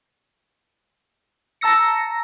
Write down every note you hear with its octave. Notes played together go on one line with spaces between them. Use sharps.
A5 A#5 E6 A#6 C#7